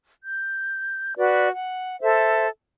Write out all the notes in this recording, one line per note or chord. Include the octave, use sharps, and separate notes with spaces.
G6
F#4 B4 D5
F#5
A4 C5 E5